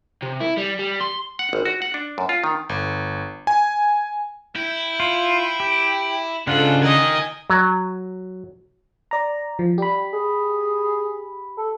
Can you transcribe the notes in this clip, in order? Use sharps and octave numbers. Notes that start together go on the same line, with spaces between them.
C3
E4
G3
G3
C6
F#5
G#1
F#4
F#5
D4
F#2
F4
D#3
G1
G#5
E4 G5
F4
G4
G#2 C#3 D4 F4 A4 F#5
D#3 D#5 G#5
F#3
D5 A#5
F3
G3 G4 B5
G#4
A4